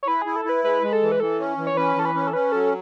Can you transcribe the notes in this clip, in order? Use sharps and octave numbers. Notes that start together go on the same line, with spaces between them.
C#5
E4 B4
E4 G#4
A4
E4 B4
G#3 B4
G#3
A4
E3
B4
E3 A4
C#4
E3
C#5
C#4 B4
E3 A4
B4
C#4
A4
C#4 B4
F#3 A4